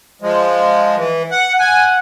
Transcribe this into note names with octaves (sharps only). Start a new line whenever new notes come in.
F3 G#3
E3
F#5
F#5 G#5